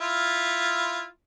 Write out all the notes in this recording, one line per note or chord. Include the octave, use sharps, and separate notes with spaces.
E4 F4